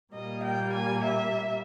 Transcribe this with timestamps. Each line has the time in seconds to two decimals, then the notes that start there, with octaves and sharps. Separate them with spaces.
0.13 A#2 G3 A#3 D#5
0.43 G5
0.73 G#5
1.04 E5